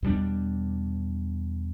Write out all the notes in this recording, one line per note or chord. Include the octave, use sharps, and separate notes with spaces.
E2 B2 G3 D4